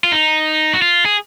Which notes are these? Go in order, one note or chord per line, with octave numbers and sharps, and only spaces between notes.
F4
D#4
F#4
F4
G#4